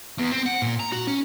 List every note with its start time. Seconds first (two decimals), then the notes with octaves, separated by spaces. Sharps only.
0.18 E2
0.31 C4
0.46 F#5
0.62 A#2
0.80 A#5
0.92 F#4
1.07 C#4